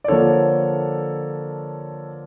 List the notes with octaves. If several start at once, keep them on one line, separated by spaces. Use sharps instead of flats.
D5
D3 F3 A#3 A4 C#5